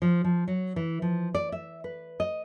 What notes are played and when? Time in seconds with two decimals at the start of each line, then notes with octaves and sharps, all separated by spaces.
0.02 F3
0.24 F3
0.48 F#3
0.76 E3
1.02 F3
1.35 D5
1.52 E5
1.84 B4
2.20 D#5